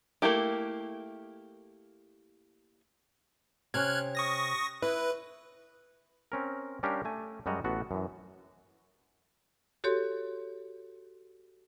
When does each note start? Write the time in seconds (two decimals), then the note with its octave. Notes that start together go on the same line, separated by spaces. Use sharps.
0.22 A3 A#3 E4 G4
3.74 C3 C#4 F6 F#6 G#6
4.15 C#6 D#6 A#6
4.82 E4 B4
6.32 C4 C#4 A#4
6.83 G3 C#4 D4 G4 A#4 F5
7.05 A3 G#5
7.46 F#2 G3 G#3 F#4 D#5 A#5
7.64 A1 B3 F#4 A4
7.91 F#2 E3
9.84 F#4 G4 A4 C#5 C6